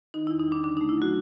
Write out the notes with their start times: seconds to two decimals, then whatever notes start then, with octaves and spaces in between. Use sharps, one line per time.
0.14 D#3 D#4
0.27 E2 E4
0.40 D#4
0.47 G3 D4
0.64 D3 D4
0.77 A3 D#4
0.89 E4
0.98 F#3 F#4